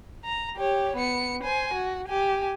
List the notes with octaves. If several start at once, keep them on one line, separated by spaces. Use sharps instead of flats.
A#5
G4 C#5
B3 C#7
C5 G#5
F#4
G4 G#5